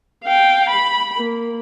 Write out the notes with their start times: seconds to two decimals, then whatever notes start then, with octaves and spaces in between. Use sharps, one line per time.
0.24 F5 G5
0.69 B5
1.17 A#3